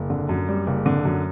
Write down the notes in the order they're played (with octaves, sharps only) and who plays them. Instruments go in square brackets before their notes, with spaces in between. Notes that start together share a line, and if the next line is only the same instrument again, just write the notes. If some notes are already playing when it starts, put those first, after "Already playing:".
Already playing: [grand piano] F#1
D3
F#2
G3
F#1
D3
F#2